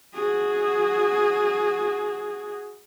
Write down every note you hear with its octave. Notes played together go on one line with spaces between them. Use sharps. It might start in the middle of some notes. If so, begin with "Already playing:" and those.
F#4 G#4